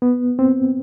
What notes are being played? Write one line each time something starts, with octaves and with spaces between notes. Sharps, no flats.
B3
C4